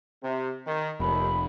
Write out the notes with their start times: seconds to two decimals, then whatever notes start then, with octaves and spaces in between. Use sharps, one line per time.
0.22 C3
0.66 D#3
1.00 F1 D#2 B5